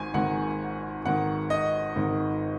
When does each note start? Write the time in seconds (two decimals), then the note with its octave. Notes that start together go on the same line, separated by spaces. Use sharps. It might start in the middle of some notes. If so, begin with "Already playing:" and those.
Already playing: G#1 G#2 D#3 G#5
0.14 G#1 G#2 D#3 F#5
1.05 G#1 G#2 D#3 F#5
1.50 D#5
1.96 G#1 G#2 D#3